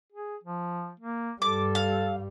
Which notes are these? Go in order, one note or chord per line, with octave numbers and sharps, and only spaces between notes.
G#4
F3
A#3
G2 G3 A4 D6
F5